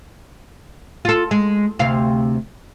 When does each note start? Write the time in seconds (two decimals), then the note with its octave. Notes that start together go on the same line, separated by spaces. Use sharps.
1.05 F4 A4
1.31 G#3
1.79 D2 C3 F5